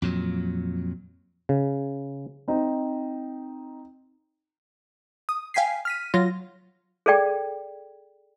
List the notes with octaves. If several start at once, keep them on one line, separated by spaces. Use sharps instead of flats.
F2 A#2 F#3
C#3
C4 D#4
D#6
F5 G5 G#5 B6 C7
F6 B6 D#7
F#3 F4 A#6
G#4 A4 D5 G5